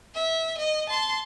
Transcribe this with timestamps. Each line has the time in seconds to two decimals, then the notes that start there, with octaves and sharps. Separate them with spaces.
0.15 E5
0.58 D#5
0.89 A5 C6